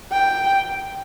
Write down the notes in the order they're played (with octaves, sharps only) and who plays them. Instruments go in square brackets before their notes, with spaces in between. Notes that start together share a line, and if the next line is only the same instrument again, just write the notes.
[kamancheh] G5